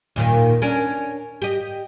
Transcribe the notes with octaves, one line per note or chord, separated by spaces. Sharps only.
D#2 A#2 D#3
C#4 D4 A#4
G4 D#5